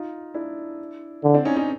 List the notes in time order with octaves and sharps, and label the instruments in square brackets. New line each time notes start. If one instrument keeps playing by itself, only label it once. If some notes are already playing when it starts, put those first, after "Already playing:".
Already playing: [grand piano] D#4 F4
D4 E4
[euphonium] D3
[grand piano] C4 D4
C#4 D#4
C#4 D#4